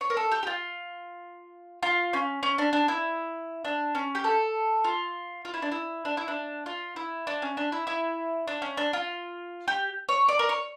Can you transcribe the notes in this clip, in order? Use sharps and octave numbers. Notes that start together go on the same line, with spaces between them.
C#5
A#4
A4
G4
G4
F4
F4
C#4
C#4
D4
D4
E4
D4
C#4
G4
A4
F4
F4
E4
D4
E4
D4
E4
D4
F4
E4
D4
C#4
D4
E4
E4
D4
C#4
D4
F4
G4
C#5
D5
A#4
C#5